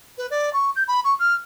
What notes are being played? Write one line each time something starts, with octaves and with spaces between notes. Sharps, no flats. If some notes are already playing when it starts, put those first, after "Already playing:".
B4
D5
C#6
G6
B5
C#6
F6